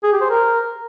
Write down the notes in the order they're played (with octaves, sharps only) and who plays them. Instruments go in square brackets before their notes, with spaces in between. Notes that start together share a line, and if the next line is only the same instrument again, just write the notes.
[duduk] G#4
G4
C5
A#4